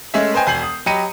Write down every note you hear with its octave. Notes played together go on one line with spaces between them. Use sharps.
G#3 A3 C#4 G#4 E5
B4 C5 D#5 G5 G#5 C6
E1 G#5 G6 C7 F#7
D#6
F#3 G4 D#5 B5 C#7 D#7